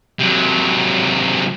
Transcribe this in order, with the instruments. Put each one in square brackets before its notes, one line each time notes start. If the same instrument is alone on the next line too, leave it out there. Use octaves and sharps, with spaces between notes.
[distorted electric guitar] C3 F#3